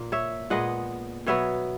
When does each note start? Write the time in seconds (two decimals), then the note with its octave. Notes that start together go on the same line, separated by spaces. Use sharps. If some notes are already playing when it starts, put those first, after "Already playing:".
Already playing: A#2 A#3
0.12 C#5 E5
0.50 A#2 G#3 B3 D#5 F#5
1.26 B2 F#3 B3 C#5 E5